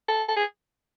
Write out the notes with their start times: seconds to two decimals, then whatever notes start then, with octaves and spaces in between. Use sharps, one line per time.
0.08 A4
0.28 A4
0.37 G#4